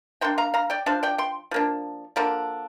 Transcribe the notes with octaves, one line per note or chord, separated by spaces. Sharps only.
C3 A#3 D4 G5 C6
F5 A#5
F5 A#5
D5 G5
F3 D4 C5 F5
D5 G5
G5 C6
F3 A#3 D4
D3 F3 A#3 D4